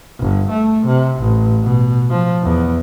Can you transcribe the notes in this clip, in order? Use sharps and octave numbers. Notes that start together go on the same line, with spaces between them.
G1
A3
C3
A1
B2
F3
E2